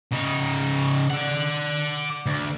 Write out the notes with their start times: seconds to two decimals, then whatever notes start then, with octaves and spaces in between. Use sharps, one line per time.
0.13 C#3 D#4
1.10 D5 F#5
2.27 D2